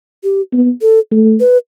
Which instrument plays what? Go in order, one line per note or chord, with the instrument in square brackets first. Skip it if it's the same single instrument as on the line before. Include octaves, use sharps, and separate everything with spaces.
[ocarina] G4
[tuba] B3
[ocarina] A4
[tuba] A3
[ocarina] B4